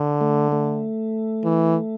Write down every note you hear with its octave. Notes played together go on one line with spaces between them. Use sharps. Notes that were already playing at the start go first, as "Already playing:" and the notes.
Already playing: D3
A3
A3
E3